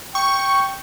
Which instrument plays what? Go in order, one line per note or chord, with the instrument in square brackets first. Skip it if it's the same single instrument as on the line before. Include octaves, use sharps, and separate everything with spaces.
[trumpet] G5 [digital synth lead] C#6